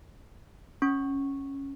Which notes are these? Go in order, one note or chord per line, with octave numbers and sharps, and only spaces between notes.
C#4 C#6